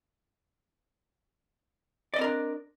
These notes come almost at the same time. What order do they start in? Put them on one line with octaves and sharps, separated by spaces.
D5 D#5 C4 A#4 D4